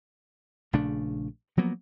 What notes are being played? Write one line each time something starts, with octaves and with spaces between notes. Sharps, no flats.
A#1 C#3 A3 D4
F3 F#3 A#3 B3